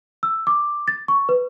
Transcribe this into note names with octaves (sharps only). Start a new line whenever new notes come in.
E6
D6
A6
C#6
B4